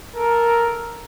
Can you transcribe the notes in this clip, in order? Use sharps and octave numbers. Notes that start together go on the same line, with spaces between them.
A4 A#4